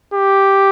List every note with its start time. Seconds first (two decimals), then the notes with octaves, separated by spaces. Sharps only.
0.14 G4